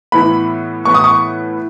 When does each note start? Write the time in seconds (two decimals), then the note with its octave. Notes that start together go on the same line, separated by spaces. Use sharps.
0.12 A2 E3 B3 B5
0.85 A2 E3 B3 C#6
0.94 D#6
1.04 C#6